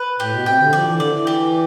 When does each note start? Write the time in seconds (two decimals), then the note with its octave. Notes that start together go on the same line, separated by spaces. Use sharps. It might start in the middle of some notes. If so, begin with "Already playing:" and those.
Already playing: B4
0.20 A2 G4
0.32 B2
0.46 C3 G5
0.60 D3
0.73 F3 D5
0.86 E3
0.97 D3 D5
1.10 E3
1.27 G4